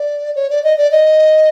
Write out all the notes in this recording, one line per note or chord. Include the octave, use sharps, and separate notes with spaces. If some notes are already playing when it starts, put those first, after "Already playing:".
Already playing: D5
C#5
D5
D#5
D5
D#5